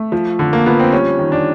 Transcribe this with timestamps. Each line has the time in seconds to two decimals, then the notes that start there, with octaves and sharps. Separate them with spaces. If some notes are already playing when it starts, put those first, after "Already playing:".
Already playing: A3
0.12 F3
0.39 D3
0.53 A#3
0.66 F3 B3
0.79 C4
0.92 G3 C#4
1.19 D#3
1.32 D4